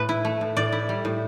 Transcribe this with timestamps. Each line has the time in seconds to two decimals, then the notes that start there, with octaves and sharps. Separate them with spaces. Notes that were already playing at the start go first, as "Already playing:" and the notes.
Already playing: A2 A4 B4
0.09 E4
0.25 A3
0.41 A2
0.57 A2 D5
0.72 E4
0.89 G3
1.05 A2